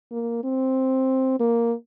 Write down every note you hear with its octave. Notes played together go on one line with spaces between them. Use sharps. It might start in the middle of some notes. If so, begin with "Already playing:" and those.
A#3
C4
A#3